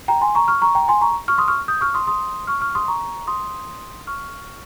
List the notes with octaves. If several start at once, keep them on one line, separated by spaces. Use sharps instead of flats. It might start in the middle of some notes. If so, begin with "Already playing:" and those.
G5 A#5
G#5 C6
A#5 C#6
C#6 F6
A#5 C#6
G5 A#5
G#5 C6
A#5 C#6
C#6 F6
C6 D#6
C#6 F6
D#6 G6
C#6 F6
C6 D#6
C6 D#6
C#6 F6
C#6 F6
C6 D#6
A#5 C#6
C6 D#6
C#6 F6